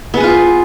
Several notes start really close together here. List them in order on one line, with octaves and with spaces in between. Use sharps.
B3 G#4 B4 F4